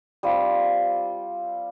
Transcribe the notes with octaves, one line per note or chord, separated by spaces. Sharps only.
G3 C4 F4